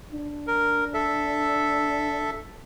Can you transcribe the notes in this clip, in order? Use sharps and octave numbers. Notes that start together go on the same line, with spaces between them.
D4
A#4
A4 E5